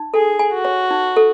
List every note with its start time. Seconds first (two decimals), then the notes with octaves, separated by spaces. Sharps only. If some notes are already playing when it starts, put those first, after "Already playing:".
Already playing: D#4
0.14 G#4 A4
0.39 G#5
0.53 F#4
0.65 C#5
0.91 D#4
1.16 A4